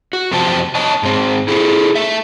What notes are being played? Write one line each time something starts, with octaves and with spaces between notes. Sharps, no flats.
F#4
F2 C3 F3 G4 C5 A5
C#5 D#5 A5
G#2 C4
E4 G#4 A4
A3 E5